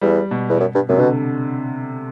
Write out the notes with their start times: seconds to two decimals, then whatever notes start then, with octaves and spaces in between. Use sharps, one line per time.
0.01 E2 G3
0.31 B2
0.49 E2
0.60 F#2
0.75 G2
0.89 F#2 C3
0.99 B2 D3